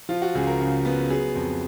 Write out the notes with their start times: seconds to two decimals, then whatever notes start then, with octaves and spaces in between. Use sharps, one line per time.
0.09 F3 F4
0.22 F#4
0.35 C#2 G#4
0.47 A#4
0.61 C#3
0.85 B3
1.10 F#3 G#4
1.35 F2